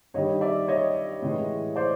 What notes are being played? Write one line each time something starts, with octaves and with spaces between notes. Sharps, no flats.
G2 D#3 G3 C#5 D#5
D5 E5
C#5 D#5
A2 E3 G#3
C5 D5